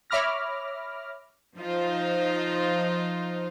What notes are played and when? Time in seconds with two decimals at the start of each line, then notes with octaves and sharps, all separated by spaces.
0.10 C#5 E5 B5 D6 F6 A#6
1.57 F3 D#4 F4 C5